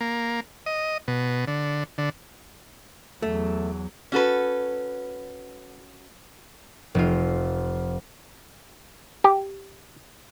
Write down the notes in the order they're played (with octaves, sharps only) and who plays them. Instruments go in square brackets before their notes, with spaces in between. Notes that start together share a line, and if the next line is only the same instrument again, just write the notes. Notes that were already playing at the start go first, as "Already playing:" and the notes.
[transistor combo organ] A#3
D#5
B2
D3
D3
[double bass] E2 F#3 [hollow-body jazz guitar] A3
[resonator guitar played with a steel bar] C#4 F#4 A4 B4
[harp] F1 F4
[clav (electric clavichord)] G4